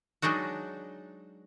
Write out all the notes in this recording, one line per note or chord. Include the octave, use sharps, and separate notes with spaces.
F#3 G#3 D4 D#4 F#4